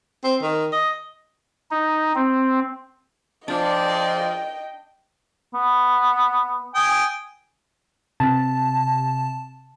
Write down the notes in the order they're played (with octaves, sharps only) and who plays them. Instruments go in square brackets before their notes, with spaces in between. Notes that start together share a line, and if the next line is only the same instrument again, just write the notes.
[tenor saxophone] C4
D#3
D#5
[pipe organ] D#4
C4
[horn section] F3 G#4 D5 [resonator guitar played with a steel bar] D4 [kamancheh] D#5 G5
[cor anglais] B3
[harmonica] G5 G#5 D#6
[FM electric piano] C3 A5